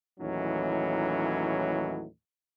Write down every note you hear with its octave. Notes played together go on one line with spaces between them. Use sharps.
D#2 A2 E3 F#3 C#4 D#4